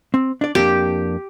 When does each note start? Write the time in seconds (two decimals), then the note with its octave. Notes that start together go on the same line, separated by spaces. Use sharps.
0.14 C4
0.41 D4 D5
0.55 F2 A#3 D4 G4